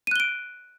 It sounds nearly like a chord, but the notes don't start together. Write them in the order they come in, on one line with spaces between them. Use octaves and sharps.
D#7 F#6 G7 D7